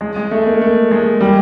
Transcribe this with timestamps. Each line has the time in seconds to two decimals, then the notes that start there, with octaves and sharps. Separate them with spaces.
0.01 G#3
0.16 G#3
0.31 A3
0.47 A#3
0.61 A3
0.91 G#3
1.21 G3